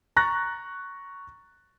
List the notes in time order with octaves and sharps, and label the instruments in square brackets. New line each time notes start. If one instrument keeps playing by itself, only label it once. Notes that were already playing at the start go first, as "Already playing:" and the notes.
[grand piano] A#5 C#6 F#6 A6 A#6